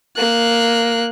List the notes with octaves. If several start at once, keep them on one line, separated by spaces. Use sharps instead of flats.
A#3 F#6